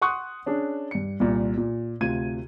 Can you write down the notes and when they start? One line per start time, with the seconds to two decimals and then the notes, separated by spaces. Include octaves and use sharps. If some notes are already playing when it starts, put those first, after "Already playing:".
0.01 F#5 C6 C#6 D#6 F#6
0.46 C#4 D4 G#4
0.91 G2 C#7
1.20 C2 A#2
1.57 A#2
2.01 D2 C3 F4 G#6 D#7